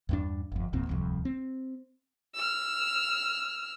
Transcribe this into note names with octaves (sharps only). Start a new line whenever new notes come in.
E2 G2 D4
G1 F2
F#1 E2 A#2 C4
D1 C2 F2
C4
E6 F6